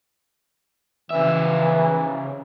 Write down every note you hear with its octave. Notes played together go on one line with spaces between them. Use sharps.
C#3 E3 E5